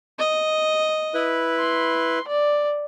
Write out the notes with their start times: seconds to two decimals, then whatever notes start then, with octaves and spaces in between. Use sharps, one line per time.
0.19 D#5
1.14 E4 B4
1.59 C6
2.28 D5